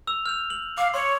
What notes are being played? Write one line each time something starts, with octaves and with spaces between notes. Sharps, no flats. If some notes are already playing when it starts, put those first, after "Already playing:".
E6 F7
F6 G6 F7
F#7
F5 D6
C#5 C6